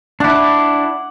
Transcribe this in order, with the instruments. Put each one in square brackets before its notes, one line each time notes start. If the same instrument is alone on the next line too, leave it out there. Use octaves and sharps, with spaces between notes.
[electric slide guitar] D4 E4 [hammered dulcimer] F#5 D6